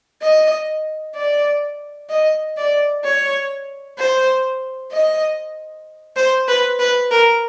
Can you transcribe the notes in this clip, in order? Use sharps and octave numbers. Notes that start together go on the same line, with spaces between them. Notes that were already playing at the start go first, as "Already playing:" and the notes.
D#5
D5
D#5
D5
C#5
C5
D#5
C5
B4
B4
A#4